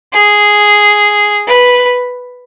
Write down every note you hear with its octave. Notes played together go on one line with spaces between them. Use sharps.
G#4
B4